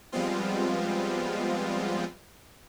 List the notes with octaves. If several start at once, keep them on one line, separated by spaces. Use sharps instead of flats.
F3 G3 G#3 B3 C4 F4